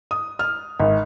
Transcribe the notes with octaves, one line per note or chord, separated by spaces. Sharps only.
D#6
F6
G#1